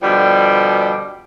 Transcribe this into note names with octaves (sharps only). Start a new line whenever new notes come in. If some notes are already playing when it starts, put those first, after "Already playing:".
B2 D3 F3 G3